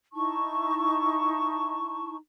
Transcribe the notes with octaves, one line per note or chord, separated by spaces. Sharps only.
D#4 E4 A5 C#6